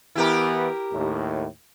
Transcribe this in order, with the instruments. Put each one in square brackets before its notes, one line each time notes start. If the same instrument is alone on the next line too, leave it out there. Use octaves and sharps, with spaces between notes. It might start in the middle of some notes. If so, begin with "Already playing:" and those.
[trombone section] E3 B3 [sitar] E4 G4 A#4
[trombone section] D#2 A2